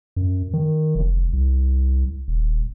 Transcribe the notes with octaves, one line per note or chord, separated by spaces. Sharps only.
F#2
D#3
F1
C2
D#1